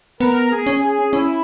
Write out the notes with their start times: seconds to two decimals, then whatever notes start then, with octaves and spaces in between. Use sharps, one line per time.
0.20 B3 A#4
0.52 G#4
0.67 C#4
0.82 G#4
1.12 C#4 E4